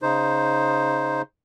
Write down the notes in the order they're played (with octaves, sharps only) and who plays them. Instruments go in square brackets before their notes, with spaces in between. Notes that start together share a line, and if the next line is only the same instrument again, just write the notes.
[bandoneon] C#3 D#4 C5